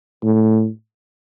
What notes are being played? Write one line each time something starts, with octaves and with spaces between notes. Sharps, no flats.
A2